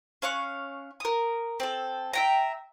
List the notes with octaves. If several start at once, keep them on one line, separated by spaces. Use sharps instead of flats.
C#4 F5 C#6 F#6
A#4 D#6
C4 A4
E5 G5 A#5